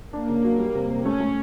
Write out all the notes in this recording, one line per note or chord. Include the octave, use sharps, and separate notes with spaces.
A#3 D4
C#3
F#3
G3
C3
C3
A3 C#4
A3